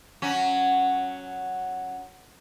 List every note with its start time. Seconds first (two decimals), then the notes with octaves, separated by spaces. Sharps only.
0.22 F#3 C#4